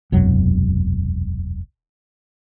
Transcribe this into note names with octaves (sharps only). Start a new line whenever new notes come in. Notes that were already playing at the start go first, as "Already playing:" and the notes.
E1 C2 F#2 F#3